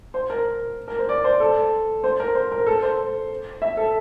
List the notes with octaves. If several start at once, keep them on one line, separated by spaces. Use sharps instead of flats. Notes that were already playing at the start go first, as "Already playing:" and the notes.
C5
A#4
A#4
C5
D5
C5
A4
C5
A#4
C5
A#4
A4
C5
E5
A4